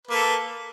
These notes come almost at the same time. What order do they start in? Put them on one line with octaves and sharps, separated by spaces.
B4 A#3 A4